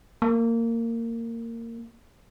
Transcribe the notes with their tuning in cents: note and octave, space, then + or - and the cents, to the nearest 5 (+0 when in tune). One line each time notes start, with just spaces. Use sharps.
A#3 -20